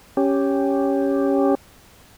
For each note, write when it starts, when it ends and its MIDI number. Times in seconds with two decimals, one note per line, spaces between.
0.17 1.55 61
0.17 1.55 67